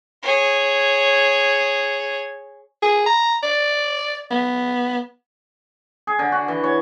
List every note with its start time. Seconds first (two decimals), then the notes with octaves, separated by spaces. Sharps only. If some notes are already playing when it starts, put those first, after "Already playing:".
0.23 G#4 C#5
2.82 G#4
3.06 A#5
3.43 D5
4.31 B3
6.07 G#4
6.19 D3
6.32 F#4
6.48 E3
6.63 C#5